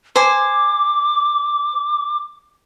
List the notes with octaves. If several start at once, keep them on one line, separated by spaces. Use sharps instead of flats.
C5 G#5 D6